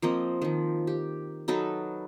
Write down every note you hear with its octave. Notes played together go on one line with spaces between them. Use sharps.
F3 A#3 C4 D#5
D#3 F3
G4
F#3 D#4 A4 B4